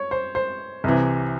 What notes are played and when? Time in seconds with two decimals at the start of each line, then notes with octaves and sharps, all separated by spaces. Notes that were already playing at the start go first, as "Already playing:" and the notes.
Already playing: C#5
0.11 C5
0.35 C5
0.84 C2 C3 E3